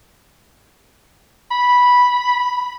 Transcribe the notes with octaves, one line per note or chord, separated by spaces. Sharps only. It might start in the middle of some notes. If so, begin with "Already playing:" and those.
B5